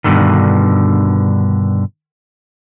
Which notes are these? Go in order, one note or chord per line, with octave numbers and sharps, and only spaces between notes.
G2 B2 D3 D#3